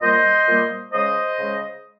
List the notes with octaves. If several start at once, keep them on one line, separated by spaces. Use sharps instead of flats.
A#2 G3 A#3 C5 D#5
A#2 G3 A#3
C#3 G#3 C5 D#5
C#3 G#3